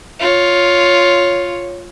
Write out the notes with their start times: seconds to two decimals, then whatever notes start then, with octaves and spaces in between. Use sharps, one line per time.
0.20 F4 C#5